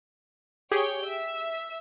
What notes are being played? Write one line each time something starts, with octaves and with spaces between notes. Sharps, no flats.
G4 G#4 C#5 G5
E5